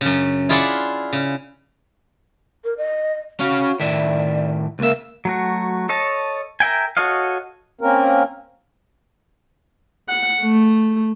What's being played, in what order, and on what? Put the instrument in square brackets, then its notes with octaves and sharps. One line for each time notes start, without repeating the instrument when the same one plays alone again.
[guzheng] F#2 C#3
E4 F4 G#4 D5 E5 F#5
C#3
[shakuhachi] A#4
D#5
[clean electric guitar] C#4 F5 [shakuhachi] F#4
[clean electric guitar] A2 D#3 E5 [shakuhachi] D5
[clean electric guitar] C#2 E5 [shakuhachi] A#3
[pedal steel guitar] F#3 A3 F#4
A4 C#5 D#5 A5
A#4 E5 G5 G#5
F#4 A4 C#5 D#5 F5
[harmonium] A#3 C4 C#4 A#4
[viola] F#5
A3